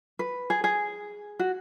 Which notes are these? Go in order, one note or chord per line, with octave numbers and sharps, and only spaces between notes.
B4
G#4
G#4
F#4